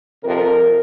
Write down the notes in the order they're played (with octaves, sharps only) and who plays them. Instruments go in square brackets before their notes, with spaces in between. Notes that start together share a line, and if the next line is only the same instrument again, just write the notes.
[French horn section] F2 C3 F3 A#4